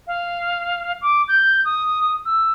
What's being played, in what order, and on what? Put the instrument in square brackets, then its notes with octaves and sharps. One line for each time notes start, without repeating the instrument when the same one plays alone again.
[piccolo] F5
D6
G6
D#6
E6